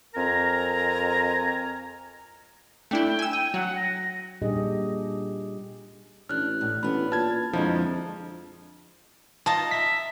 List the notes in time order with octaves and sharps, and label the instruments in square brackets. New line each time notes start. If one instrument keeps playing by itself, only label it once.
[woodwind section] F2 C4 A#4 G#5 A#5
[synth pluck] A3 D4 E4 [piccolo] G5
[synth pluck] G#5 E6
[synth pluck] G5 [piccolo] D#7
[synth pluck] F#3 [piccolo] F#5
[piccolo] A#6
[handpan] A#2 G3 D4 G4 G#4 D#5
[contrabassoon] A1 [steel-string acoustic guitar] D4 [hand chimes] F6 F#6
[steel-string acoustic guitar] A2
[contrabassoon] A1 [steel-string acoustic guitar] B3 D4 [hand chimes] B5
[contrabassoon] A#2 [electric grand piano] A5 G#6 [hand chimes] F6
[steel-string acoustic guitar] F2 G#3 [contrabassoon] D3 [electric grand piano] F3 [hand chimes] E4
[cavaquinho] D#4 F4 D#5 [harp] A5
[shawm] E5 [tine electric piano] B6